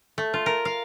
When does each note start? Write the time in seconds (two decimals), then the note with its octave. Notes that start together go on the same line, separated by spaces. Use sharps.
0.18 A3
0.34 F4
0.46 A#4
0.65 F5